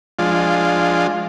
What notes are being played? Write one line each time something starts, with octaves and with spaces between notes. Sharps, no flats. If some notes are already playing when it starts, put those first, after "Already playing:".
F3 G#3 D4 F4